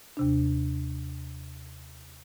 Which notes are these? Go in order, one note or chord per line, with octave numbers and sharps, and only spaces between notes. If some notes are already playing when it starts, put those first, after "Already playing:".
D#2 C3 D4